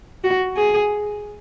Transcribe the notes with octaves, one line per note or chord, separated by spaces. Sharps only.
F#4
G#4